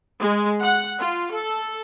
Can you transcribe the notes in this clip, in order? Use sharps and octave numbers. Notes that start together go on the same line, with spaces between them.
G#3
F#5
F4
A4